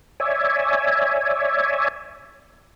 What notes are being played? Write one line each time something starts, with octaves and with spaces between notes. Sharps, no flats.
C#5 D5 E5 G#5